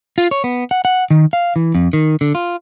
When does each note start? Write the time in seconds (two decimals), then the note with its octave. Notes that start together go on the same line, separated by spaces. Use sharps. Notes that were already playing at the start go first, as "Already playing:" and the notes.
0.18 F4
0.31 C#5
0.44 B3
0.71 F#5
0.85 F#5
1.11 D#3
1.33 F5
1.56 E3
1.75 F2
1.93 D#3
2.21 D3
2.35 F4